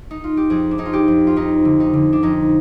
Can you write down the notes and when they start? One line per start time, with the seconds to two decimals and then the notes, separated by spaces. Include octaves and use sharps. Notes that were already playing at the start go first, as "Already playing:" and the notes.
0.11 D#4
0.24 F4
0.37 G4
0.50 F2 G#4
0.71 D4
0.78 F2 D#4
0.85 F4
0.93 G4
1.08 F2
1.27 F4
1.36 F2 D#4
1.65 D3
1.80 D#4
1.93 D3
2.13 D4
2.23 F2 D#4